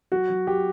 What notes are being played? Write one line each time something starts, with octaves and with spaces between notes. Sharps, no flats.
F#3 F#4
F#3
F#3 G4